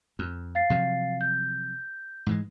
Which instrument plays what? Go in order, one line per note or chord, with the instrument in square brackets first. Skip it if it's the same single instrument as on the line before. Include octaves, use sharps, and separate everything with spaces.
[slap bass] F2
[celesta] F5 A6 C7
[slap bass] C3 F3 F#3
[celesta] G6
[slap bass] G#2 E3 G#3